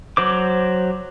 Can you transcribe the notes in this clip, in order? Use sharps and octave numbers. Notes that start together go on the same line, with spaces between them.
F#3 C5 D6